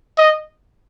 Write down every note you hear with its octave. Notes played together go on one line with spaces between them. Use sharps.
D#5